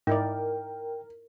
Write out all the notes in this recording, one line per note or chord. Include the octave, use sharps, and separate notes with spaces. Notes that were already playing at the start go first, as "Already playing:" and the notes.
G#2 D#4 E4 A#4 D5 G5